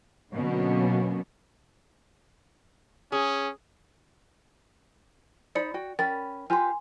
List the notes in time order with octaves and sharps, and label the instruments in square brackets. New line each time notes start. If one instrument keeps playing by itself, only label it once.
[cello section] B2 D3 F#3 A#3 B3 C#4
[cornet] C#4 [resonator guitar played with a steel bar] G#4
[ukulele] D#4 C5 B5 [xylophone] D5 C#7
[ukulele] F#4 G5
[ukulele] C#4 B5 [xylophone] A#4 G5 A6
[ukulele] F4 G4 B4 [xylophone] G#5 C6